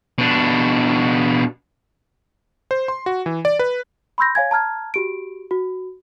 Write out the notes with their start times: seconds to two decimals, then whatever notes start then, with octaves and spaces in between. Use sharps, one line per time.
0.18 B2 D4
2.71 C5
2.88 C6
3.06 F#4
3.26 E3
3.45 D5
3.59 B4
4.18 B5 C6 E6 G6 A#6
4.35 C#5 F5 G#5 G#6
4.51 A5 A#5 F6 G#6
4.94 F#4 G4 D7
5.51 F#4